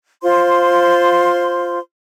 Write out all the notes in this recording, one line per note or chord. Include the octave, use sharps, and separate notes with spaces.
F4 C5 C6